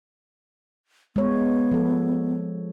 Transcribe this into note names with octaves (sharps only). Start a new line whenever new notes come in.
G#3 B3 C#5
F3 A4